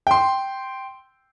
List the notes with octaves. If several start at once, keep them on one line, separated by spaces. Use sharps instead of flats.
G5 C6